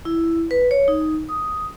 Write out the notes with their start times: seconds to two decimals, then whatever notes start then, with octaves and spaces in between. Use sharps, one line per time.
0.05 E4
0.51 B4
0.71 C#5
0.88 D#4
1.29 D#6